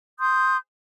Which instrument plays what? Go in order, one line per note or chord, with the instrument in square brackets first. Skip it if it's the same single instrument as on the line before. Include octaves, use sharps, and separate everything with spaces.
[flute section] C6 D#6 G6